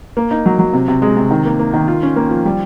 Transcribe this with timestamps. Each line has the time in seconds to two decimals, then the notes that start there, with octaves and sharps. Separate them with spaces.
0.17 A#3
0.31 D#4
0.46 F#3
0.59 F#3
0.73 C3
0.88 C3
1.02 G#3
1.17 C3
1.31 D#3
1.45 A#3
1.59 A#3
1.74 D#3
1.88 F4
2.02 C#4
2.16 A#3
2.30 F3
2.45 G3